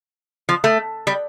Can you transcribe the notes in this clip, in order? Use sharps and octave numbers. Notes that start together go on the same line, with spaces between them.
F3
A3
G3